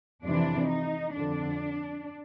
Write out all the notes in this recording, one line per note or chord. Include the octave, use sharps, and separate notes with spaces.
F2 C3 E3 D4
D#4
F2 D3 D4